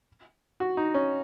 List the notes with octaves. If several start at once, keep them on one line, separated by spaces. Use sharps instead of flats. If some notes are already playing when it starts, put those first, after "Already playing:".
F#4
D#4
C#4